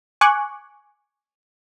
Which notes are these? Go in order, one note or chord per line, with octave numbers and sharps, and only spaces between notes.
G#5 C#6 D6 F#6